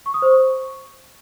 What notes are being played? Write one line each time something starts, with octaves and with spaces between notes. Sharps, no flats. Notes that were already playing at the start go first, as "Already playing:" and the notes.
C#6
D#6
C5
C#6